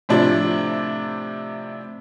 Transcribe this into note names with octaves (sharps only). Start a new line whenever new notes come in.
A2 C3 F3 D4